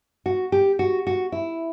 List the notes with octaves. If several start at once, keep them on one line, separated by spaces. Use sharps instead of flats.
F#4
G4
F#4
F#4
E4